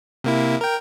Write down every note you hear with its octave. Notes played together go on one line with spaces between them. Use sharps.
C3 A#3 E4
A#4 G5